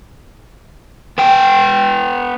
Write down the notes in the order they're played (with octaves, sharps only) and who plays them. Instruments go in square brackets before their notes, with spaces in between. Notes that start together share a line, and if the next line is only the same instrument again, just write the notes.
[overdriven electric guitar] B3 G5